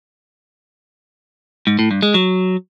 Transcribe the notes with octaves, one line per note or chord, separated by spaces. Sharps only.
G#2
A2
G2
G#3
F#3